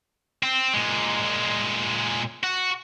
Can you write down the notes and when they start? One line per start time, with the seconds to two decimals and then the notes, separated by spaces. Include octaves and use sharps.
0.43 C4
0.74 A#2 G#3
2.44 F#4